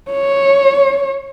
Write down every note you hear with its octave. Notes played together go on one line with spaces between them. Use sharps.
C#5